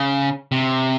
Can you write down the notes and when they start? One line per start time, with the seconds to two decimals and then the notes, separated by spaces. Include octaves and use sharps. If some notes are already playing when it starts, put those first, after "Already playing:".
Already playing: C#3
0.52 C3